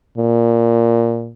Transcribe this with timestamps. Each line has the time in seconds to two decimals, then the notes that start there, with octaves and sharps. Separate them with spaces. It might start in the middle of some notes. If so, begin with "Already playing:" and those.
0.17 A#2